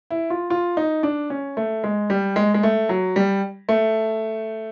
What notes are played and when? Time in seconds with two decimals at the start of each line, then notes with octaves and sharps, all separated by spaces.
0.11 E4
0.30 F4
0.50 F4
0.77 D#4
1.03 D4
1.30 C#4
1.57 A3
1.84 G#3
2.10 G3
2.36 G#3
2.54 G#3
2.63 A3
2.89 F#3
3.16 G3
3.69 A3